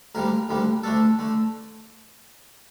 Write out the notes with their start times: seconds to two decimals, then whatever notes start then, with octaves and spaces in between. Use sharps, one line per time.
0.15 D2 D3 G3 A#3 A#4
0.49 D2 D3 G3 A#3
0.83 D2 D3 A3 D4 A4
1.19 D3 A3